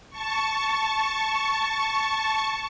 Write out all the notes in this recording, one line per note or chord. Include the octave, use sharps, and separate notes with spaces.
A5 C#6